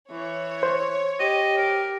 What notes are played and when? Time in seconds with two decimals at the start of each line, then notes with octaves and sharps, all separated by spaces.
0.11 E3 C#5
0.63 C5
1.20 G4 D#5
1.58 A#4